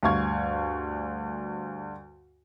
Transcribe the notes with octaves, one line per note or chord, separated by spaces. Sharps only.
D2 G2 F5 C#6 G#6